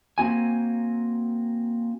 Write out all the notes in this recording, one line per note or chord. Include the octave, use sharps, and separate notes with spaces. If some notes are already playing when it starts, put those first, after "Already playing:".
A#3 C4 F#4 G#5